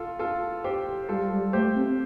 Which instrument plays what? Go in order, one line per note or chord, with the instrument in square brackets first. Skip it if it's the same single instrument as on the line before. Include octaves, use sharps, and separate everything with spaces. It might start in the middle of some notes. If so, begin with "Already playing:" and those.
Already playing: [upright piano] F4 A4
F4 A4
G4 C5
[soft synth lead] G3 [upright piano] F4 A4
[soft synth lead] G3
[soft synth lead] A3 [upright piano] G4 C5
[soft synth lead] C4